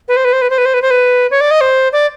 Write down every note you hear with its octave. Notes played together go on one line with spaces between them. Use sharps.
B4
C5
B4
C5
B4
C5
B4
C5
B4
C5
B4
C#5
D5
D#5
C5
D5